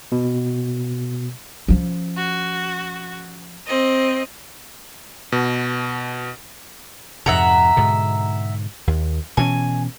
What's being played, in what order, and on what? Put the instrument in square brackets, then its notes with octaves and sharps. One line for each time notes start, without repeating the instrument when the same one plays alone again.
[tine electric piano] B2
[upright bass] F3 C#4
[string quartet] F#4
C4 D#5
[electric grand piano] B2
[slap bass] F2 G#2 C3 [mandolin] E5 F#5 A#5
[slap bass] G#2 B2 D3
D#2
[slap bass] B2 E3 C#4 [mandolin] G#5